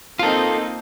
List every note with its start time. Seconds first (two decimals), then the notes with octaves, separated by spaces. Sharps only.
0.19 A#3 C4 D#4 F4 A4